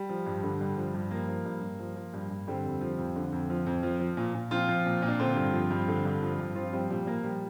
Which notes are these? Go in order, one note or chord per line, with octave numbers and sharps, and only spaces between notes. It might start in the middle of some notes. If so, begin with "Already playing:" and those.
Already playing: G3
F3
G2
D3
G2
F3
G2
F3 A#3
F3
G2
G2
F3
F3
G2
G2
D3 G3 C4
F2
F3
F2
D3
F2
F3
F2
F3
F3
A#2
A#2
F3 C4 F4
F3
A#2
A#2
D4
D3 C4 F4
G2
F3
G2
D3
G2
F3
G2
F3 C4 F4
F3 G3 C4
A#2 G3
A#2 A#3
F3 G3